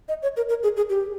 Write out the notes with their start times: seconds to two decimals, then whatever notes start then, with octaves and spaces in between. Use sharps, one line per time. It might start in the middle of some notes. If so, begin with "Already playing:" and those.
0.08 D#5
0.23 C#5
0.37 A#4
0.49 A#4
0.63 G#4
0.77 G#4
0.90 G4